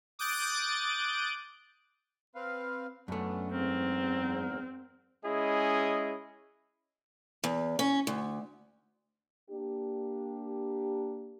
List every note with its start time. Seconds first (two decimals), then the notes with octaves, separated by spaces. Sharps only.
0.19 D6 D#6 F#6 G6 A6 D7
2.35 C4 B4 F5
3.08 F#2 A3 B3 C#4 D4
3.52 E2 G#2 C4 A#4
5.24 G#3 C#4 E4 G#4 D#5
7.44 E2
7.79 C#4
8.07 D2
9.50 A#3 D4 G4